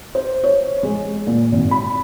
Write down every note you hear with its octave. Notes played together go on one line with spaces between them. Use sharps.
C5
C#5
G#3
A#2
G#1
B5